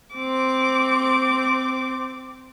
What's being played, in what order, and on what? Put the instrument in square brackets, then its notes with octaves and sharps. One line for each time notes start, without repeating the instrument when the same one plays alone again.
[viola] C4 D6